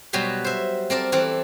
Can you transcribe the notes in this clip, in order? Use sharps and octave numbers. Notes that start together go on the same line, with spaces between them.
B2 F#3 G3 B4 C6
C5 E5
C4 A#4 D5 A5
E3 C4 E4 A4